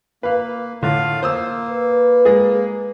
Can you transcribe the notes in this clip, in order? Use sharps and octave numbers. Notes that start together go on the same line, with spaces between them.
A#3 B4 F5
A2 D3 F4 F5
A#3 C5 D#6 E6
B4
G#3 G#4